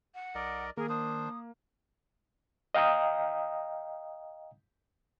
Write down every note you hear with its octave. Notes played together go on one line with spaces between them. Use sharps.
F#5
B1 A#4 D5 D#5
D#3 A#3 G#4 A#4
D4 C5 D#6
D#5 F5 G5 A#5 D#6